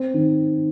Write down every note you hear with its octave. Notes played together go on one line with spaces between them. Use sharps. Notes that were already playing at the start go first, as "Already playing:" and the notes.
Already playing: C4
D#3